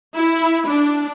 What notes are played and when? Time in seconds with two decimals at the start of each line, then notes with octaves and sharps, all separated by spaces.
0.14 E4
0.69 D4